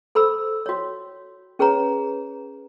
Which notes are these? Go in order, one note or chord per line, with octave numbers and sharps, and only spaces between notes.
A4 C5 B5 E6
F#4 C#5
C#4 G#4 B4 C#5 A#5